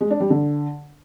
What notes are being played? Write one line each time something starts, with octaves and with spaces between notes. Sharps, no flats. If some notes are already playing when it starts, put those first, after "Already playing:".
G#3
D4
G3
D3